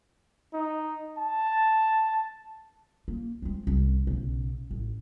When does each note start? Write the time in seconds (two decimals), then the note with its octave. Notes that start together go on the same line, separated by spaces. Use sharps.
0.54 D#4
1.18 A5
3.08 A#3
3.42 G#3 C4
3.67 C2
4.07 B1 C#3
4.71 A1